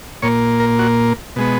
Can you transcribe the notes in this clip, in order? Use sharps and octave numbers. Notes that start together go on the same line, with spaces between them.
A#2 A#3 C#5
A#4
F#4
B2 G#3 B3